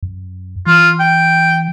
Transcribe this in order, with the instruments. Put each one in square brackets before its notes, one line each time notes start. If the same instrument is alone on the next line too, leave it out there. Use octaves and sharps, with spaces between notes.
[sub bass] F#2
[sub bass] E3 [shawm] F4
[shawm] G5